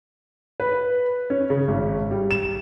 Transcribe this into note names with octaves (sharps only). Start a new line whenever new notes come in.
B4
C#4
C#3
G#1
G3
E7